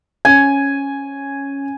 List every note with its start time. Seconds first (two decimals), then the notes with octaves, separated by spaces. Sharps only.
0.25 C#4 G#5